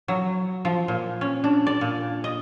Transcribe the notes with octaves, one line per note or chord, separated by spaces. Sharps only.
F#3
F3
A#2
C#4
D4
D5
A#2
D#5